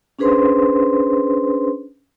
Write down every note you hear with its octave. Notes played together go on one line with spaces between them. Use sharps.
C#4 D4 G#4 B4 C5 C6